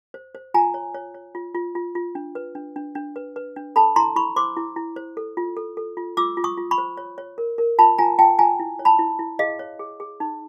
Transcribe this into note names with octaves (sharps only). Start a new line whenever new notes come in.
C5
C5
F4 G#5 A#5
C#5
C#5
C#5
F4
F4
F4
F4
D4
B4
D4
D4
D4
B4
B4
D4
A4 A5 B5
E4 A#5 C6
E4 B5 C#6
C5 C6 D6
E4
E4
C5
A4
F4
A4
A4
F4
F4 D6 E6
F4
C#6 D#6
F4
B5 C#6
C5
C#5
C#5
A#4
A#4
F4 A5 B5
F4 G#5 A#5
F4 G5 A5
F4 G#5 A#5
E4
C#5
A5 B5
E4
E4
G#4 D#5 F5
C#5
G#4
G#4
D#4